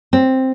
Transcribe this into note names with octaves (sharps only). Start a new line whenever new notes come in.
C4